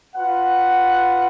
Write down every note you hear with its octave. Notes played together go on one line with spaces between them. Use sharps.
F4 B4 F#5